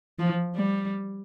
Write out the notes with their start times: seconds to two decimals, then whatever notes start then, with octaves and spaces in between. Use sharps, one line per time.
0.19 F3
0.55 G3